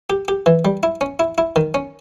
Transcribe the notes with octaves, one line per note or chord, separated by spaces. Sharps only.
G4
G4
E3
G3
E4
C#4
E4
E4
D#3
C#4